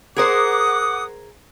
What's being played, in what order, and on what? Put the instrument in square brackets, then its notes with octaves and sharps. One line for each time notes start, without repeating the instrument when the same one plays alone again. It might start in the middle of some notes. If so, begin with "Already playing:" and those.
[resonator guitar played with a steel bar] G#4 A#4 C5 [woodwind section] F#5 D6 D#6